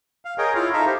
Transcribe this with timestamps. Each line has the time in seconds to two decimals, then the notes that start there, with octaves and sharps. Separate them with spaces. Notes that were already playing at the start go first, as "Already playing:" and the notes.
0.25 F5
0.38 G#4 A#4 C#5 D#5 G5
0.55 E4 F4 C#5 F5
0.73 D#4 A4 E5 F5 A#5
0.86 G4 C5